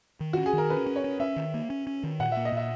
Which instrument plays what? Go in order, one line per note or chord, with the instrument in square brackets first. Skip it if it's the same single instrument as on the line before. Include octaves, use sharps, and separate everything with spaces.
[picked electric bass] D#3
[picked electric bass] C#4 [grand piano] F#4
[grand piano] G#4
[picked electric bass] D#3 [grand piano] A#4
[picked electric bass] C#4 [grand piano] B4
[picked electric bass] C#4
[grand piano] C#5
[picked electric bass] C#4
[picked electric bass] C#4 [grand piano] E5
[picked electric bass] D#3
A#3
C#4
C#4
D#3
[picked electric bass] A#2 [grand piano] F#5
[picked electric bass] A#3 [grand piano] E5
[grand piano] D#5
[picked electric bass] A#2 [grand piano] E5